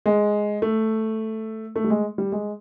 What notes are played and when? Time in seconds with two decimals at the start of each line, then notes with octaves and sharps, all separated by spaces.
0.06 G#3
0.62 A3
1.76 A3
1.84 G3
1.90 G#3
2.18 G3
2.32 G#3